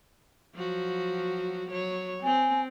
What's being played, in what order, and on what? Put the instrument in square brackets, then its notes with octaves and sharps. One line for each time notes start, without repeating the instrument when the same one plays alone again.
[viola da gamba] F3 F#3 F#4
F#3 C#5
[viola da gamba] C4 [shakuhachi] G#5